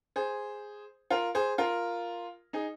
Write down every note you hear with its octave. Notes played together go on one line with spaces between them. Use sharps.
G#4 C5
F4 A#4
G#4 C5
F4 A#4
D#4 G#4